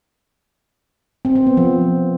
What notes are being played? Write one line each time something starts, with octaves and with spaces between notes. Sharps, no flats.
C4
C4
B3
F3